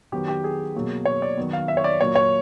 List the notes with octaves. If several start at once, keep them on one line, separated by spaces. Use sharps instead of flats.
D#3 F#3 B3 G4
G4
G#4
B2 F#3 A#3
C#5
D5
D#3 F#3 B3
F5
E5
C#5
D5
A#2 F#3 A#3 C#5
C#5